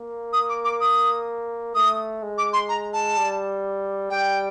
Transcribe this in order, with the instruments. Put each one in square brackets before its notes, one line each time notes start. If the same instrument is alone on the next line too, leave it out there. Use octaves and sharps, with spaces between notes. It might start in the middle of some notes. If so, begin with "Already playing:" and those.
Already playing: [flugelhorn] A#3
[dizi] D#6
D6
D6
D#6
[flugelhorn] A3 [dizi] D#6
[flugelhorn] G#3
[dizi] D6
C6
A#5
A5
[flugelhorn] G3
[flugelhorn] G3 [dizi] G5